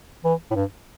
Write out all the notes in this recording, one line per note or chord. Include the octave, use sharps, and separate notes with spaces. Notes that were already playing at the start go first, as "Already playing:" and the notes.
E3
A2
G2